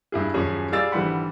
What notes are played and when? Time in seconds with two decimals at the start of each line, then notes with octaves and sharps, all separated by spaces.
0.12 G2 E4 G#4
0.34 D#1 F#2 F3 C#4 G#4
0.72 G3 G#4 D5 F5 E6 A6
0.92 G#1 D3 E3 G3 F#5 B5